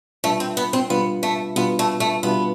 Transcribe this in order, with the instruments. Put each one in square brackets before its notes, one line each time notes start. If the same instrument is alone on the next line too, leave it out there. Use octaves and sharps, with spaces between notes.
[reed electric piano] B2 G3 D4 F4 B4 [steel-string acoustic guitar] A3
[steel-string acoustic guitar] C4
B3
C4
[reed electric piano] B2 G3 D4 F4 B4 [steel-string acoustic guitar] B3
[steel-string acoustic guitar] A3
[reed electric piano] B2 G3 D4 F4 B4 [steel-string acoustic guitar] B3
[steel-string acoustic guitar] A3
A3
[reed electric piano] B2 G3 D4 F4 B4 [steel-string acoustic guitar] B3